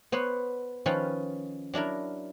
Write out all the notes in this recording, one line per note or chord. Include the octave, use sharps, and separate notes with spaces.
B3 C5 C#5 F#5
D#3 F3 C#4 B4 C#5 G5
F#3 D4 E4 A#4